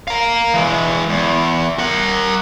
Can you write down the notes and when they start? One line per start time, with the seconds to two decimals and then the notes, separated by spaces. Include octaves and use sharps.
0.08 F5 A#5
0.54 E3 G#3
1.09 E2
1.79 A#4 F#5